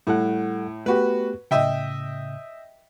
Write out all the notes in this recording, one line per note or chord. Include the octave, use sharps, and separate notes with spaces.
A2 G3 A4 F#5
A3 B3 F#4 G4 B4
A2 C#3 D#5 E5 G5